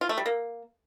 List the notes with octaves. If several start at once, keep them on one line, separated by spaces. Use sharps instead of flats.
F4
A3
G3
A#3